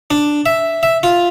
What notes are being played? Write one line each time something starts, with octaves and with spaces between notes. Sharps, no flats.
D4
E5
E5
F4